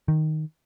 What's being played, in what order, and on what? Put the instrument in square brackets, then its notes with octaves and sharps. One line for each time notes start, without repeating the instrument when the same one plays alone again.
[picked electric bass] D#3